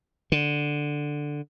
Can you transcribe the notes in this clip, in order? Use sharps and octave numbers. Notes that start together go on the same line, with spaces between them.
D3